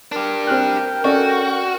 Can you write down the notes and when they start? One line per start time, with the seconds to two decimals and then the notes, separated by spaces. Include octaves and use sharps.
0.12 D4 G4 A#4
0.47 C4 G5 F6 F#6
1.04 C#4 F#4 A4 D5